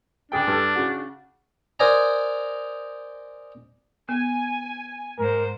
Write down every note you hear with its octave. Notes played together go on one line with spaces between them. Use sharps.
C#2 D4 G#4 G5
G2 A4
C#3 F#4
A#4 C5 D5 D#5 G#5 A#5
B3 G#5
G#2 A#4 C5